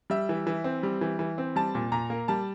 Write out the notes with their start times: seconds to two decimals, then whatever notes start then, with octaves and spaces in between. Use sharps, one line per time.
0.10 G3 E5
0.29 E3
0.47 E3
0.64 C4
0.83 G3
1.01 E3
1.19 E3
1.38 C4
1.56 G3 A5
1.75 A#2
1.92 A#2 A#5
2.10 A#3
2.28 G3 A5